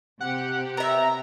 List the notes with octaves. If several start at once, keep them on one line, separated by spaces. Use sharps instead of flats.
C3 G4 F#5
B3 E5 A#5